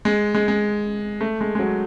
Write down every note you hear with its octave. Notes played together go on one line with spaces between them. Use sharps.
G#3
G#3
G#3
A3
G#3
G#3
F#3